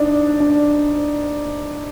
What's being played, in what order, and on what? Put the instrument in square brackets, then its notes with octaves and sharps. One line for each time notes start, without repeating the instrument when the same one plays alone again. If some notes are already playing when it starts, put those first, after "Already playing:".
Already playing: [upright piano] D4 D#4
D4